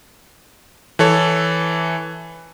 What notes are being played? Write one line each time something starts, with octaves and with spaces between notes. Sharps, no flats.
E3 A4 C#5